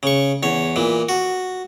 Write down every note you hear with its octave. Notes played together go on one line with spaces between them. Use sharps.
C#3 C#6
E2 C#5
A#2 E3
F#4